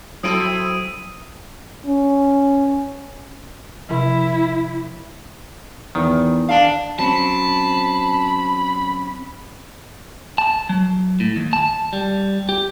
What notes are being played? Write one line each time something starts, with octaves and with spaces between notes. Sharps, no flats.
F#3 C4 E4 A4 D#6 D7 D#7
C#4
C3 F3 E4
E2 D#3
D4 F5 A5
F#3 C4 C#4 A5 B5
A5
F#3
A2
D#2
A5
G3
G4